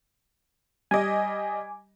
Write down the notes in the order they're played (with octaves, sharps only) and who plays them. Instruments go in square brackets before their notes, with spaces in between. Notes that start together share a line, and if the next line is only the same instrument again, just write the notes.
[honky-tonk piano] G3 D#5 [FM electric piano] G#5 D6